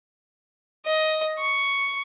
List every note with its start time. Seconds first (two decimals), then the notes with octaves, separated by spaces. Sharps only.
0.86 D#5
1.39 C#6